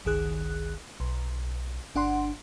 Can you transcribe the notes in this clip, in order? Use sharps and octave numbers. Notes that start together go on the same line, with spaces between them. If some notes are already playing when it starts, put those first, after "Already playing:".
G1 C#2 D#3 G#4 F#6
B1
G1 D4 F#5 C6